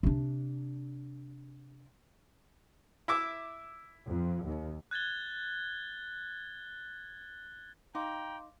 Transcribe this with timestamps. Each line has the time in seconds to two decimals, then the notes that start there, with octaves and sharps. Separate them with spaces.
0.03 C3 D4
3.08 E4 E5 D6
4.08 F2
4.45 D#2
4.91 F#6 G#6 A6 G7
7.95 D#4 F5 G5 A#5 C6 D6